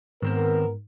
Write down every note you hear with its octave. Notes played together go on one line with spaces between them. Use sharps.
G#2 D#3 B3 C4 A#4 C5